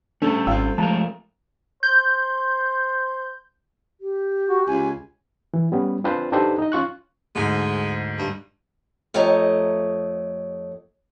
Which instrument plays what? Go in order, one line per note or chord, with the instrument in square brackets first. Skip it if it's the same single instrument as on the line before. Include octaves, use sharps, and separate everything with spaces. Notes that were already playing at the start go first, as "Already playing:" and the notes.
[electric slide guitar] G3 C#4 A4 [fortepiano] A3 [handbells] D4
[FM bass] G#1 [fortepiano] C4 F4 [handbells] G5 E6
[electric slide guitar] F3 A3 A#4 [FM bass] G#3 [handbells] A5 A#5
[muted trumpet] C5 [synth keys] G6
[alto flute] G4
[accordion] F#4
[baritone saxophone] C#2 [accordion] G#5
[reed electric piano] E3
G3 B3 C#4
C4 D4 F4 B4 C5
D4 D#4 G4 A4 B4 C5
D#4 D#5
C#4 F4 C#6 F#6
[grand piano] D2 G#2 [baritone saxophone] G#3
[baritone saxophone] G2
[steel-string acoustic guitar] F2 A3 G4 C#5 D#5 A#5